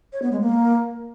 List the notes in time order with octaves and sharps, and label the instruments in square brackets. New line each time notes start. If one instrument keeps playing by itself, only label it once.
[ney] C#5
B3
G#3
A#3